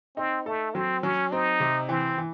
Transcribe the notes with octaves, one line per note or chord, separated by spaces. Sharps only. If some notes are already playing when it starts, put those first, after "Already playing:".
C4 D#4
A3 A4
F#3 C4
F#3 C#4
C4 D#4
C3
E3 C4
E3